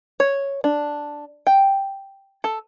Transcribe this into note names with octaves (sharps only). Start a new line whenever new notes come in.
C#5
D4
G5
A4